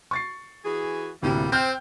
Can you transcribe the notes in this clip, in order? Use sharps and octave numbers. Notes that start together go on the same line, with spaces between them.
C#6 A6 C7
E3 F#4 G#4
D2 A2 C3 G3 A#3
C4 G5 F6 G6